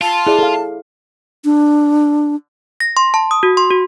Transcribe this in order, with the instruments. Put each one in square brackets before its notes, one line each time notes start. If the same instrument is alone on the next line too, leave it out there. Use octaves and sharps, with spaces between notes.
[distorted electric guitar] F4 [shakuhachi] A5
[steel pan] E4 D5 [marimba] G#4
[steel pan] A4 F5
[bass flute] D4
[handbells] A#6
C6
A5
D#6
F#4
C6
F#4